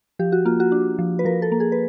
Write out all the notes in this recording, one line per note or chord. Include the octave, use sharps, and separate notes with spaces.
F3 G4
F#4
A#3 F4
F#4
D4
F3
B4
F3 A#4
A4
A#3
G#4
B4